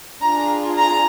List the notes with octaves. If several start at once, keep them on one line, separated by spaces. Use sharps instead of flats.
D4 F4 G#4 A#5
A#5